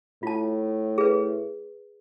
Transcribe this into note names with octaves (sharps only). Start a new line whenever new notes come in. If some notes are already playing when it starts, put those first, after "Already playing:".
A2 F4 A5
G#4 B4